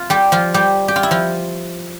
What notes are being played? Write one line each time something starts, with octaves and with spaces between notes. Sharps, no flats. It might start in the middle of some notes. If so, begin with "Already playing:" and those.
Already playing: F4
G3 G4
F3 F4
G3 G4
G4
F4
E4
F3 F4